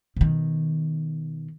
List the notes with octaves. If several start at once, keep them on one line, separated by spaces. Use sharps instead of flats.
B2 D#3